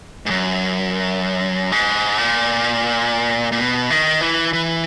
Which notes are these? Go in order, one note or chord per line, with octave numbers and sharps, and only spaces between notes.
G#2
F#2
G#2
A#2
A#2
B2
D#3
E3
E3